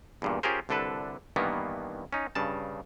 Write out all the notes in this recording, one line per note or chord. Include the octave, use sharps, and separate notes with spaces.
E2 G2 A#2
C#4 F4 G4 G#4 A#4 C5
C2 D3 D4 A4 B4
G2 D#3 E3 A#3 B3
C#4 D#4
G2 C#3 A5